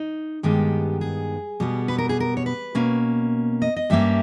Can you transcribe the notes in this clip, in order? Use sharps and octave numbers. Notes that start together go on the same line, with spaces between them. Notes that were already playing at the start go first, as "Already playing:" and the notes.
Already playing: D#4
G2 D#3 G#3 B3 G4
G#4
B2 G3 B3
B4
A#4
G#4
A#4
C#5
B4
B2 A#3 C#4
D#5
D#5
G2 G3 A#3 C#4 E5